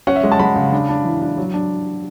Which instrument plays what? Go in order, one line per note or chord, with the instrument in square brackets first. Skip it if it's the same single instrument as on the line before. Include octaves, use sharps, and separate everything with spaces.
[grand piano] C#4 F#5
E5
G#3
A5
G#3 B5
C#3
D4
D4
E3
D4
F#3
D4